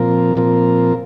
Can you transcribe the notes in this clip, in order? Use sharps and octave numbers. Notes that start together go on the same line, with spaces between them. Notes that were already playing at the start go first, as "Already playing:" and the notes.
Already playing: A#2 F3 C4 F4 A#4
A#2 F3 C4 F4 A#4